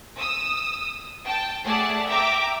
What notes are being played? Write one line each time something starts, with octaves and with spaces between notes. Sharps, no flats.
D#6 E6
G5 A5
A3 G#4 D5 F#5 A5
E5 G5 A#5 D6